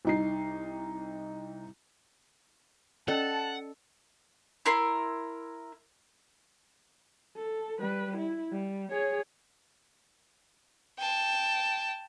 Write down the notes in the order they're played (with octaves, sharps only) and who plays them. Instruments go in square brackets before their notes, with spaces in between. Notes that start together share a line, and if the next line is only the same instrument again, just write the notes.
[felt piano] C2 D#4 C7
[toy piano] C#4 D5 D#5 [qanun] A4 [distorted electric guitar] F#5 [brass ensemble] A5
[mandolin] E4 A#4 C6
[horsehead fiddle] A4
G3 B4
E4
G3
G#4 C#5
[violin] G5 A5